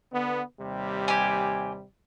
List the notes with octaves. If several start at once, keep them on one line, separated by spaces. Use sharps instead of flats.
D3 B3
D#2 C3 G3
G4 G#5